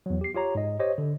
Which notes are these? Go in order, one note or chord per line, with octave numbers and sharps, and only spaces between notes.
E2 F#3
G4 C7
F4 G4 C#5 A#5
G#2 D#5
G4 C5 C#5 D#5
D3